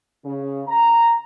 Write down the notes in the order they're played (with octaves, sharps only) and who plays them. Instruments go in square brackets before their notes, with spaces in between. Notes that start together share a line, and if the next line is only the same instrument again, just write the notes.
[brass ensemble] C#3
A#5